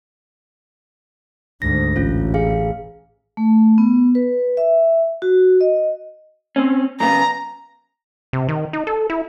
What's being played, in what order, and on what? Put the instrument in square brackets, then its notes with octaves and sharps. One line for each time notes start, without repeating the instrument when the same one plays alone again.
[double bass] D2 G#2 [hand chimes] A#6
[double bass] A1 [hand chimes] C#4 F4
[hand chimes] G#4 F5
[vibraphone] A3
B3
B4
E5
F#4
D#5
[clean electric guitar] C4 C#4
[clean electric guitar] F#2 C#3 B3 [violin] A#5
[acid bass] C3
D#3
D#4
A4
E4